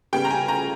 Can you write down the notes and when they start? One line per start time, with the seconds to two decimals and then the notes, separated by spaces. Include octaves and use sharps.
0.13 C#3 G3 B3 G5
0.24 A#5
0.30 G#5
0.48 A#5